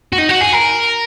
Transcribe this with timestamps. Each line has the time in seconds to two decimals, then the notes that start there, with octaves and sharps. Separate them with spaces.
0.12 F#4
0.18 D#4
0.29 F#4
0.41 G#4
0.53 A#4